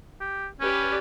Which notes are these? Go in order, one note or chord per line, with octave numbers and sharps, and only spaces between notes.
G4
C#4 G4 B4 D5